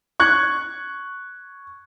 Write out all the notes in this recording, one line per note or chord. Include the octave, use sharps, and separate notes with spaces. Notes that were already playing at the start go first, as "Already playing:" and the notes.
C#6 F#6 G#6